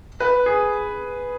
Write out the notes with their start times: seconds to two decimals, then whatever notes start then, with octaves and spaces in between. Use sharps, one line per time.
0.20 B4
0.46 G#4